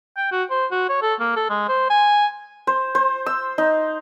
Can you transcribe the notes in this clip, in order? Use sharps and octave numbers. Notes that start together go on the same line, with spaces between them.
G5
F#4
C5
F#4
C#5
A4
A#3
A4
G#3
C5
G#5
C5
C5
E6
D#4